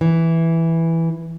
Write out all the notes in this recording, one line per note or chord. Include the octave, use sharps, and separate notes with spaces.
E3